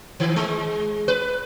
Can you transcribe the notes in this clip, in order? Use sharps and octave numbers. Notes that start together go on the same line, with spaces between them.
D#3
G#3
B4